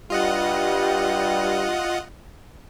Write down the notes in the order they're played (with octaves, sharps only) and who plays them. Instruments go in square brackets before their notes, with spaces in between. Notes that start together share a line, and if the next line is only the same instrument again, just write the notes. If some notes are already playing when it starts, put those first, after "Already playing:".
[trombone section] G2 G3 [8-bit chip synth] F4 D#5 F#5